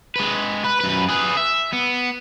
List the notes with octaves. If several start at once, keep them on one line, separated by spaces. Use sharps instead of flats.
G#3 B4
B4
F#2 B4
G#4 B4
E5
B3